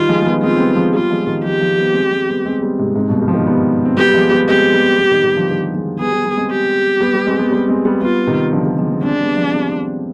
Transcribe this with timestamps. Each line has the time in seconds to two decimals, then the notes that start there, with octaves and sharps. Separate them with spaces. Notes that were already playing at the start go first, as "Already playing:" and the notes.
Already playing: D#3 G3 F4
0.09 F3 G#3
0.22 G#3
0.26 G3 B3
0.43 G#3 C4 F4
0.56 C4
0.59 G3 B3
0.76 F3 G#3
0.93 G3 B3 F4
1.10 F3 G#3
1.27 D#3 G3
1.44 F3 G#3 G4
1.61 F3 G#3
1.78 G3 B3
1.94 G#3 C4
2.11 G#3 C4
2.29 G3 B3
2.45 G#3 C4
2.62 G3 B3
2.79 G#2 C3
2.96 G#2 C3
3.09 G2 B2
3.21 D#3 G3
3.28 F3
3.34 D#3 G3
3.47 G3 B3
3.85 C4
3.97 G3 B3 G4
4.09 G3
4.14 F3 G#3
4.31 G3 B3
4.48 G#3 C4 G4
4.73 G3 B3
4.98 G3 B3
5.11 D#3 G3
5.24 D#3 G3
5.36 D3 F3
5.49 D#3 G3
5.74 F3 G#3
5.99 G3 B3 G#4
6.12 G3 B3
6.25 G3 B3
6.37 G#3 C4
6.51 G4
7.00 G3 B3
7.13 G3 B3
7.27 G#3 C4
7.39 G3 B3
7.52 G3 B3
7.68 G#3 C4
7.85 G3 B3
8.02 G3 B3 F4
8.27 C3 D#3
8.52 D3 F3
8.65 D#3 G3
8.78 F3 G#3
8.90 G#3 C4
9.03 G#3 C4 D4
9.15 C4
9.20 G3 B3
9.37 F3 G#3
9.50 C4
9.54 G3 B3